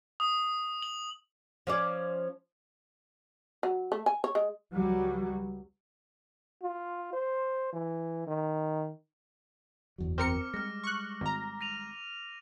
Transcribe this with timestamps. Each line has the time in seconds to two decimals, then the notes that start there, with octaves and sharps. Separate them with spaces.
0.20 D#6
0.82 F#7
1.67 F3 C#4 D5
3.63 F#3
3.92 A3
4.06 G#5
4.24 C#5
4.35 G#3
4.74 C#2 F#3 G3
6.62 F4
7.13 C5
7.73 E3
8.27 D#3
9.98 F#1 E2 F#3
10.18 C4 A#4 D6 F6 C#7
10.54 G3 G#3 F6 A#6
10.84 C#6 F#6
11.21 G#1 A#5
11.61 A#6 D#7 F7